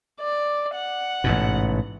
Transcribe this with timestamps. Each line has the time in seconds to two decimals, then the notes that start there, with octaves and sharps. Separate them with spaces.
0.21 D5
0.75 F#5
1.24 A1 G#2 B2